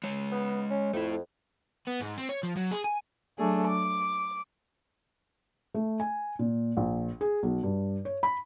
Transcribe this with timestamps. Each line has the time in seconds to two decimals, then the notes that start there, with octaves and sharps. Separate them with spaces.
0.04 G#3 C#5
0.32 B3
0.70 C#4
0.93 F2 A3 E4
1.87 B3
2.01 G#2
2.18 C4
2.29 C#5
2.43 F3
2.56 F#3
2.71 G#4
2.84 G#5
3.38 F#3 A3 D4 G#4
3.69 D6
5.74 A3
6.00 G#5
6.39 A#2
6.77 A#1
7.21 G#4
7.43 B1
7.63 G2
8.05 C#5
8.23 B5